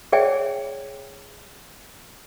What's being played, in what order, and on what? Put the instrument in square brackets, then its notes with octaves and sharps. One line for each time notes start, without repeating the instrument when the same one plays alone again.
[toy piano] G#4 C#5 D5 E5 G5 G#5